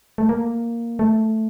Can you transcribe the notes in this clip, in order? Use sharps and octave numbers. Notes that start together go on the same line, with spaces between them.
A3
A#3
A3